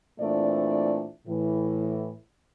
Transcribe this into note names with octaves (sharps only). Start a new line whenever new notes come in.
A#2 E3 A3 C4 D4 D5
A2 E3